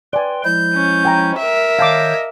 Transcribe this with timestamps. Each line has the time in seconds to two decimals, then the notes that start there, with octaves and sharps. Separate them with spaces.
0.13 B4 D5 G5 G#5 C6
0.44 F3 G#3 E4 G6
0.74 C#4
1.05 G5 G#5 A#5
1.39 A#4 E5
1.79 D#3 C#5 D#5 F5 A5 D6 G6